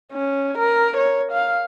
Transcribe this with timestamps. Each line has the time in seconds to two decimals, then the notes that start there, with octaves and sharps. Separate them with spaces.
0.13 C#4
0.58 A#4
0.97 C#5
1.32 F5